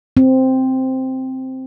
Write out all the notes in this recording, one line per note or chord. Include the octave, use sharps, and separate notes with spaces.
C4